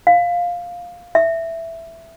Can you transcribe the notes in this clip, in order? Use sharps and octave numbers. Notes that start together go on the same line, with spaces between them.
F5
E5